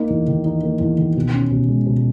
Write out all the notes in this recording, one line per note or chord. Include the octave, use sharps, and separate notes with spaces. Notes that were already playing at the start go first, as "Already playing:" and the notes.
Already playing: A#3 D#4
E2
D#3
D#4
A#3
E2
D#3
B2
C#4
B2
G#3
B2